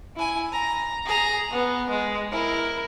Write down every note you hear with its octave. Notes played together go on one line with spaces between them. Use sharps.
E4 G#5
A#5
G#4 A#5
B3
G#3
E4 A#4